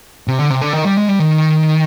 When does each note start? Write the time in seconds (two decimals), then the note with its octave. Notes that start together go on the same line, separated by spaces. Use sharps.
0.28 C3
0.39 D3
0.50 C3
0.62 D3
0.73 D#3
0.85 G3
0.97 G#3
1.08 G3
1.19 D#3